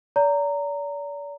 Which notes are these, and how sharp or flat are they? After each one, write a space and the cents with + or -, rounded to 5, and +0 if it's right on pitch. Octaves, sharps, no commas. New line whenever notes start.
D5 -40 A#5 -15